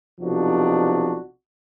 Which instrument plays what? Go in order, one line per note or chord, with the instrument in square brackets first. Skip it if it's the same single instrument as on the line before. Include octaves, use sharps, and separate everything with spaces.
[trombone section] B1 C3 F3 D4 D#4 F#4